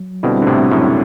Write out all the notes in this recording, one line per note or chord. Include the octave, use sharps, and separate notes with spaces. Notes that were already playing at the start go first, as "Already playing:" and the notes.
Already playing: F#3
B2 D3 G3 C4 E4
D3
A2 C3
F#2 A2